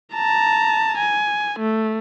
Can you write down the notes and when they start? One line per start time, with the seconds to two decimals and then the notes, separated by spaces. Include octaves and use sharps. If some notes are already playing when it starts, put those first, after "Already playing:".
0.14 A5 A#5
0.98 G#5
1.59 A3